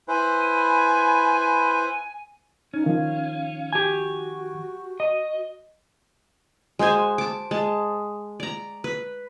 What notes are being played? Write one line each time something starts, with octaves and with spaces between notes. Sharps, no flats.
E4 B4 C5 G#5
C#4 D#4
D#3 F3 F5
F#4 G4 G#5
D#5
G#3 F#4 C5 G#5
A5 D6
G#3 A5
D5 A#5
B4